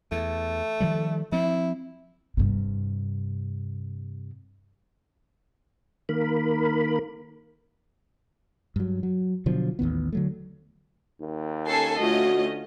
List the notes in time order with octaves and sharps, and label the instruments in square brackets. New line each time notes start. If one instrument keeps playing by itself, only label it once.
[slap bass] E2 [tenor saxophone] A3
[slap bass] D#3 F3 G3
[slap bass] F3 C4 [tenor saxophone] E4
[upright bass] G2 C3
[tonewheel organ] D#3 A#3 A#4 B5
[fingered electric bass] G2 F#3
F#3
B2 D3 F3 F#3
A1 D#2 D#3 B3
D3 F#3 A3
[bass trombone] D#2
[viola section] C#4 [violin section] A4 G#5 C7
[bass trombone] D2 [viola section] A3 C#4 F4 [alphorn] F#4 [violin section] D#5